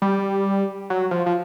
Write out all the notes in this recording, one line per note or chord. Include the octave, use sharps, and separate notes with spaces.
G3
F#3
F3
F3